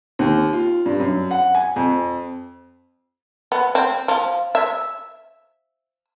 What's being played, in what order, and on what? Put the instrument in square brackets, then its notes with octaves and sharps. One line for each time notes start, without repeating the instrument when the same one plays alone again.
[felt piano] D#2
F4
G2
F#2
F#5
G#5
F2
[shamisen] B3
C4
F3
E5